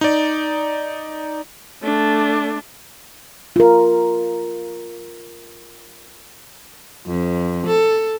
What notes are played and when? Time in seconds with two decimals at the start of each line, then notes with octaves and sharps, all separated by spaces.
0.01 D#4 D5
1.84 A3 D4
3.56 F4 A#4
7.06 F2
7.67 A4